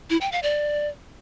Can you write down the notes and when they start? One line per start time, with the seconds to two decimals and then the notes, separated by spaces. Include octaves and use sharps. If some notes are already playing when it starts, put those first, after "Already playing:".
0.10 E4
0.21 G5
0.32 F5
0.43 D5